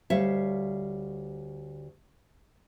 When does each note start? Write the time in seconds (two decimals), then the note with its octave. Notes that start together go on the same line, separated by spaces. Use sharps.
0.10 D2 G3 C#5 E5 F5